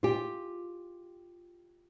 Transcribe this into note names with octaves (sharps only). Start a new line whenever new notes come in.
F4 G4